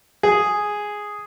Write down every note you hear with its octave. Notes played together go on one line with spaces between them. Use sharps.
G#4